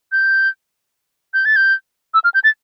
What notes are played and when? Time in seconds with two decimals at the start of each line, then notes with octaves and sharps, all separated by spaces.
0.12 G6
1.34 G6
1.45 A6
1.56 G6
2.14 E6
2.24 F6
2.34 G6
2.44 A6